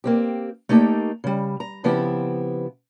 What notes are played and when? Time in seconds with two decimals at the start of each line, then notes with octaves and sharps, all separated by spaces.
0.04 A#3 C4 G4
0.69 A3 A#3 D#4 G4 A4
1.24 C#3 G3
1.60 A#5
1.84 C#3 F3 B3 C4 E4 G4